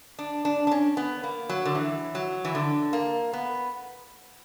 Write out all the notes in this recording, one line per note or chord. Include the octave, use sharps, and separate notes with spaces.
D4
D4
D4
C#4
B3
A#3
F#3
D3
E3
F#3
E3
D3
A#3
B3